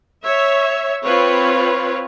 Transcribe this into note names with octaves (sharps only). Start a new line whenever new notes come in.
C#5 E5
C4 F4 B4 C#5